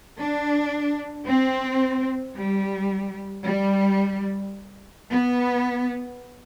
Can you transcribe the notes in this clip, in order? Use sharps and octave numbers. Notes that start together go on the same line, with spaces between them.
D4
C4
G3
G3
B3